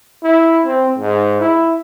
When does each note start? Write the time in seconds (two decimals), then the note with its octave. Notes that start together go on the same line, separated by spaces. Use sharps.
0.23 E4
0.66 C4
0.98 G#2
1.41 E4